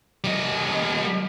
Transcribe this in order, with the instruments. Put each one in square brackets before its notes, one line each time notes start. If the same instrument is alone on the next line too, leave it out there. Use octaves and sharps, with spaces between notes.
[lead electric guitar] G3 D#5